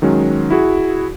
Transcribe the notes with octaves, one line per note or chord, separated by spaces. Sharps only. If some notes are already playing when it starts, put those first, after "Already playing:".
D#3 F#3 G#3 C#4
E4 F#4 G#4